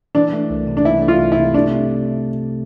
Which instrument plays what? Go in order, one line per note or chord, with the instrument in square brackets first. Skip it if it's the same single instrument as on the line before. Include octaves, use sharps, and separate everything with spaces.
[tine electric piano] E3 [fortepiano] D4
[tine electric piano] A3
C2
C3
[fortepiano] D4
[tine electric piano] E3 [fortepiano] E4
[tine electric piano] A3
[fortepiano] F4
[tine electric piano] C2
[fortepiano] E4
[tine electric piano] C3
[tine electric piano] A3 [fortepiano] D4
[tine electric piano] C3